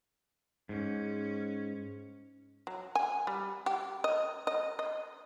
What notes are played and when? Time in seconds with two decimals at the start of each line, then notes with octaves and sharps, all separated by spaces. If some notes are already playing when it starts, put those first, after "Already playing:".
0.69 G#2 C#4
2.67 F#3
2.95 G#5
3.27 G3
3.66 G4
4.04 D#5
4.47 D#5
4.79 D#5